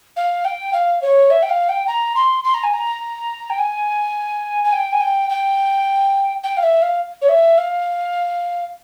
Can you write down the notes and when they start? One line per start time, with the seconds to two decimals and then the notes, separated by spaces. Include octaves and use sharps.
0.16 F5
0.44 G5
0.73 F5
1.02 C#5
1.30 E5
1.42 G5
1.49 F5
1.68 G5
1.87 A#5
2.15 C6
2.44 C6
2.54 A#5
2.63 G#5
2.73 A#5
3.50 G5
3.58 G#5
4.64 G#5
4.72 G5
4.92 G#5
5.00 G5
5.29 G5
6.43 G5
6.57 F5
6.63 E5
6.82 F5
7.21 C#5
7.28 E5
7.58 F5